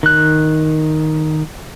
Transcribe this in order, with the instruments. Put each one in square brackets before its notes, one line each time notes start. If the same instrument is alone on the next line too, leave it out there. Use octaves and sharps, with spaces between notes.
[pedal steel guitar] D#3 F#6